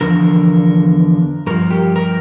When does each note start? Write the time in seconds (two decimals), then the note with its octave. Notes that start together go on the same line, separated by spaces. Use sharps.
0.01 E2 D3 F3 A#4
1.47 G2 F3 A#4
1.71 G4
1.96 A#4